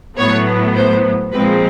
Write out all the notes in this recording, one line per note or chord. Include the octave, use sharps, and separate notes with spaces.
A2 F#3 B3 C#5
C5
A#2 F3 G#3 C4 B4